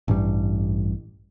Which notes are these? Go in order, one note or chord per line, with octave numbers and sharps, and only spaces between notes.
A1 G2 G3